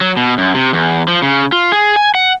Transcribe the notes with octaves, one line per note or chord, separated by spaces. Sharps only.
F#3
B2
F#2
C3
E2
F3
C#3
F4
G#4
G#5
F#5